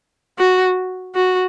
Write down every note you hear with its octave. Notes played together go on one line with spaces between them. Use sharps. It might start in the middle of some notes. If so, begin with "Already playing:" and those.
F#4
F#4